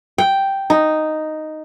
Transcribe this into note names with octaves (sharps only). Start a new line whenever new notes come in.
G5
D#4